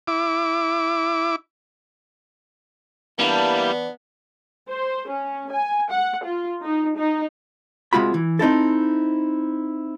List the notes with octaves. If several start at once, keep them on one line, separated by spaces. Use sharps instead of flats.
E4 D6
E3 G3 A#3 B3 D4 E4
C5
C#4
G#5
F#5
F4
D#4
D#4
C3 G#3 F4 F#4 B5
E3
C4 D#4 E4 A4